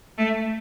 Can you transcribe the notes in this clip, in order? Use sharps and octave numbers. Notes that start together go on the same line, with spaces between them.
A3